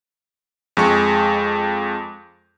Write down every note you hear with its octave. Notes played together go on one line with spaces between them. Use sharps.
F2 G#3 C#6